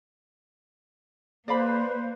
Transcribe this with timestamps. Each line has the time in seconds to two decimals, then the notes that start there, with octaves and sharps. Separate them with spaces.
1.48 A#3 B4 C5 D5 F5 B5